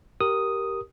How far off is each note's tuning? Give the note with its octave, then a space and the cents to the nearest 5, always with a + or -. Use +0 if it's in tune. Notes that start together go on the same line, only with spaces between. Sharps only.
G4 -10 A#4 +0 D#6 +0